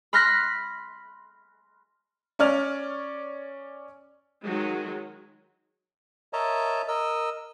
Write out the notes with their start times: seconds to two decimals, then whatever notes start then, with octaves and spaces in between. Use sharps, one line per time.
0.13 B5 C6 F6 F#6 A#6 B6
2.39 C#4 C#5 D5 F6 F7
4.43 D#3 F#3 G#3
6.33 A#4 C#5 D#5 E5 A5 A#5
6.88 A#4 D#5 E6